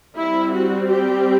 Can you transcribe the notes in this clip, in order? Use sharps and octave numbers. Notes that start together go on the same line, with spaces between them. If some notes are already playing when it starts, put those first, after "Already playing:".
G3 C4 E4
F#4
G4